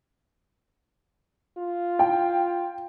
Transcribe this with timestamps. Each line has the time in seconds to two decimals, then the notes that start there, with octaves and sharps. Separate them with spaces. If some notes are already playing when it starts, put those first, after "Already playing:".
1.58 F4
1.99 G5